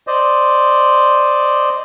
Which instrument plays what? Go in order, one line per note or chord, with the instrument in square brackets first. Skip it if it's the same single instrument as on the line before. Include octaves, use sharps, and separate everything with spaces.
[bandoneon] C5 D5 D#5